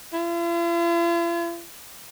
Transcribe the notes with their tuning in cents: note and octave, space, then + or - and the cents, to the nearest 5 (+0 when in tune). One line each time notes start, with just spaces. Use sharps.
F4 -45